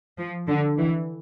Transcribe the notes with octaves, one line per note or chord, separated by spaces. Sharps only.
F3
D3
E3